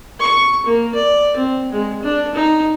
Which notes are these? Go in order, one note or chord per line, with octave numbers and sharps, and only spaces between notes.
C#6
A#3
D5
C4
G#3
D4
D#4